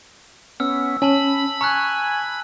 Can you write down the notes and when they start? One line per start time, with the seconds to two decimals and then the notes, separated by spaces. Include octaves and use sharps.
0.60 B3 C#4 E6 F6
1.02 C#4 G#5 A5 B5 F#7
1.61 G#5 A#5 C#6 F6 F#6